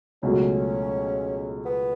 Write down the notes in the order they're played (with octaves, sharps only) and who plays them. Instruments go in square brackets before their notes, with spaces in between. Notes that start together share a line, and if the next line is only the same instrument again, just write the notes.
[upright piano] C#2 B2 F#3 A3 [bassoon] C#4
[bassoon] B3